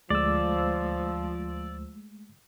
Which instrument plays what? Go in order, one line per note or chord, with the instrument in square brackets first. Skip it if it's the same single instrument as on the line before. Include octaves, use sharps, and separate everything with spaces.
[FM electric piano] D2 E6 [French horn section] F3 [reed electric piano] G#3 A3 [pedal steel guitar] D5